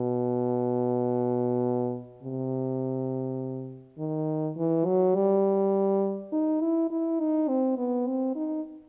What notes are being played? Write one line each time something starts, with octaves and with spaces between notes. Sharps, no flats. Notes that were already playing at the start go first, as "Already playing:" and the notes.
Already playing: B2
C3
D#3
E3
F#3
G3
D#4
E4
E4
D#4
C4
B3
C4
D#4